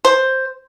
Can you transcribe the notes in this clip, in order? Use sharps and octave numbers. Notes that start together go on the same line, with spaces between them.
C5